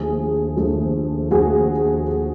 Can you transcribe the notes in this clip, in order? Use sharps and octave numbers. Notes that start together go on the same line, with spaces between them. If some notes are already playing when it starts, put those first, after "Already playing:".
Already playing: D#2 D3 F3 A3 G#4
D#2 D3 F3 A3
D#2 D3 F3 A3 F#4 G#4